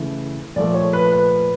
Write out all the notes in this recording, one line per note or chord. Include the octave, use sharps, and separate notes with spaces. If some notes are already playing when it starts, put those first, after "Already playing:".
Already playing: C#3 E3 A3
A#2 F3 A3 D5
C#5
B4
B4